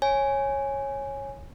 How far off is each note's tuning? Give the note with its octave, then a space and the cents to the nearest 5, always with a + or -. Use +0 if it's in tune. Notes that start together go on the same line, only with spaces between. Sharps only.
C#5 -10 G#5 +0